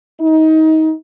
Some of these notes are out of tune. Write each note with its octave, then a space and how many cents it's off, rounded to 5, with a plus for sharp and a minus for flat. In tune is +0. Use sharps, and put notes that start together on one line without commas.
D#4 +25